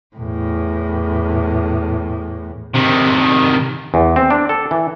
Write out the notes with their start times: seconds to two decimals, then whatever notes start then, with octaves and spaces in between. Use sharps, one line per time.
0.16 E2 A2
2.75 C3 D#3
3.94 E2
4.16 C4
4.30 D4
4.49 A4
4.71 E3